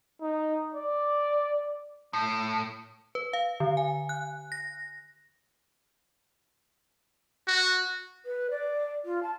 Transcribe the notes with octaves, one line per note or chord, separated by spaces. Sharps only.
D#4
D5
A2
B4
F5
D3
G#5
F#6
A#6
F#4
B4
D5
F4
A5